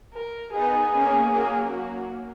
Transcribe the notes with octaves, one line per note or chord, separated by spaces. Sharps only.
A#4
B3 D#4 G#4
A#3 C#4
F#3 A#3
F#4